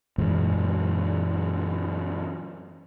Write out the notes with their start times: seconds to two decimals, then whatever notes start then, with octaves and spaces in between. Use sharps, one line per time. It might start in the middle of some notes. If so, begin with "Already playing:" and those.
0.18 F#2 A#2 E3 G#3